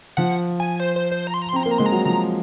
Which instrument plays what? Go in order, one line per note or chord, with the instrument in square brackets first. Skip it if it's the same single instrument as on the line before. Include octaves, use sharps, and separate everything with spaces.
[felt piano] F3 [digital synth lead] F#5
[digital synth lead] G#5
C5
C5
C5
A#5
C6
A#5
C6
[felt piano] C4 [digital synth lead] A#5
[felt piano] A#3 [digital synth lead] C6
[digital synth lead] A#5
[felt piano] G#3 [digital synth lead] C6
[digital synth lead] A#5
[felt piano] F#3
[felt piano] F3 [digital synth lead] A#5